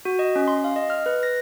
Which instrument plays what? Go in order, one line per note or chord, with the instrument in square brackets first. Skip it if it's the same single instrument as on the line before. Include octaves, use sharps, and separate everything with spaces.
[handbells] F#4
D#5
C#4
C6
F5
D#5
F6
B4
A#6